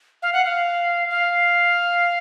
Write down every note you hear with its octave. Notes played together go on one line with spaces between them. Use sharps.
F5
F#5
F5
F5